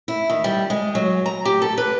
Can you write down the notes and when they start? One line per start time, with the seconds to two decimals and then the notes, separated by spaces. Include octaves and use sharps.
0.08 E4
0.30 D#3
0.44 G3
0.70 G#3
0.95 F#3
1.26 A#5
1.45 G4
1.62 A4
1.78 B4